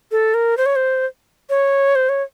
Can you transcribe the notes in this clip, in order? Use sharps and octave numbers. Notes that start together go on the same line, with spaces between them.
A4
A#4
C5
C#5
C5
C#5
C5
C#5